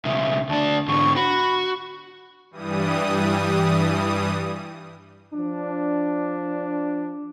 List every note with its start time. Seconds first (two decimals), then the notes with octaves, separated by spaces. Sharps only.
0.05 B1 C#3 E5
0.49 D2 D4 A5
0.88 G#2 D3 C#6
1.16 F#4 B5
2.51 G2 E3 G3 D#6
5.34 F3 D4